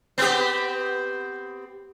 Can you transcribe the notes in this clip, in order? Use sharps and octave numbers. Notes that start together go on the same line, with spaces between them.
B3 C4 G4